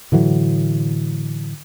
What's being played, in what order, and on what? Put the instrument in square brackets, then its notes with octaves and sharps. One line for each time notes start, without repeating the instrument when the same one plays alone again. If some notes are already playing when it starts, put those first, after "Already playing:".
[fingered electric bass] A2 D3 E3 F#3